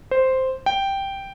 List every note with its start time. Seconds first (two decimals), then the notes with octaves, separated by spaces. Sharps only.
0.11 C5
0.66 G5